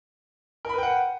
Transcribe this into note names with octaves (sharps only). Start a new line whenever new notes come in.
A#4 B4 F#5 G5 B5